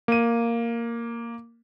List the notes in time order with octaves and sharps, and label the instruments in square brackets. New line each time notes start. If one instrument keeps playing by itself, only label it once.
[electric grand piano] A#3 D#7